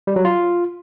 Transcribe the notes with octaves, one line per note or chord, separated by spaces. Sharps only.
G3
F#3
F4